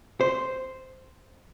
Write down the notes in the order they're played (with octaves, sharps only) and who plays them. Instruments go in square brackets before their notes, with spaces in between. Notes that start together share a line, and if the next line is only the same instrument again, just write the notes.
[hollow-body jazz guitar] C5